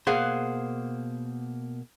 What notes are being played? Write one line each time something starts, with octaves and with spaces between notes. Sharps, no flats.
B2 A#3 G#4 C5 F5 F#5